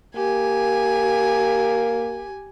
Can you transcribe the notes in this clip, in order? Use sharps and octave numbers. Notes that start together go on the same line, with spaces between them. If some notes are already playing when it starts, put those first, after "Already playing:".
A#3 G4 G#5